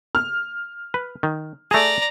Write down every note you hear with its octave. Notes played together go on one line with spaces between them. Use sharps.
F6
B4
D#3
A3 G#4 D5 A#5